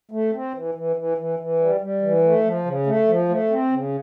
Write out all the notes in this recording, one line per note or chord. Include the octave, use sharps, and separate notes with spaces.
A3
C4
E3
E3
E3
E3
E3
G3
G3
E3
A3
F3
C#3
A3
F3
A3
C4
C#3